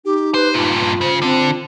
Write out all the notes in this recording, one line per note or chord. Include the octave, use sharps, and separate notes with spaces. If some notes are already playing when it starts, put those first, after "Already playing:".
D#4 G4
B4 C5
G2 A#2 F4
C#3 C5
D3 C4